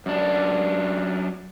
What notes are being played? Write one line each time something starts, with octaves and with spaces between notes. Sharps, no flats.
F#2 D4